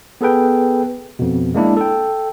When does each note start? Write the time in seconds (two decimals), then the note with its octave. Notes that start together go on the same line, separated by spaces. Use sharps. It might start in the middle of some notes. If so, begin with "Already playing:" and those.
0.21 B3 G#4 A4 B4 G5
1.19 F2 B2
1.54 G#3 A#3 D4 E4
1.77 A4 G5